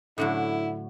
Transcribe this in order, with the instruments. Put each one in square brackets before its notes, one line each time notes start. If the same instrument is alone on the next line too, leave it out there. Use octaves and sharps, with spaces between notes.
[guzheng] A2 D3 F#3 [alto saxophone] E4